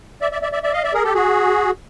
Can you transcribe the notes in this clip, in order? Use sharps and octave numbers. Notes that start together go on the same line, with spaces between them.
D5 E5
D5 E5
D5 E5
D5 E5
D5 E5
D#5 F5
D5 E5
G#4 A#4
G4 A4
F#4 G#4